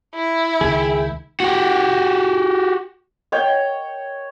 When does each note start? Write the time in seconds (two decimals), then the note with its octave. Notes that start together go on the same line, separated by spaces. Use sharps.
0.15 E4
0.61 C#2 D#3 G#4 E5 G5
1.40 F#4 G4
3.32 C#5 D#5 G5